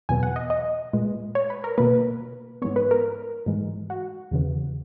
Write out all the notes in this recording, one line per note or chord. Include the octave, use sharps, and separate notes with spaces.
E2 B2 F#3 B3 G#5
F#5
D#5
D#5
A#2 G#3 B3
C#5
B4
A#4
B2 A#3 B4
G#2 E3 G#3 B3 C#5
B4
A#4
G#2 E3 G#3
F#4
E2 C#3 E3